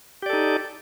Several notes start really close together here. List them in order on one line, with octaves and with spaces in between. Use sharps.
G4 D5 A4 D#4